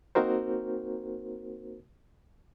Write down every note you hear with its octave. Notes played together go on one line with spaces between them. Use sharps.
A#3 C4 D#4 F#4 A#4 C5